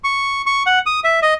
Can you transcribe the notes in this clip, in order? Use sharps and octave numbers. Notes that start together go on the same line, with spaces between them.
C#6
C#6
F#5
D#6
E5
D#5